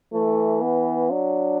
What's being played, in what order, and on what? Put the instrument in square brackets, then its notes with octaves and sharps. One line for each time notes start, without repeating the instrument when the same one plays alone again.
[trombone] E3 [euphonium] A3
[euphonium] B3
[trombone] F#3 [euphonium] D4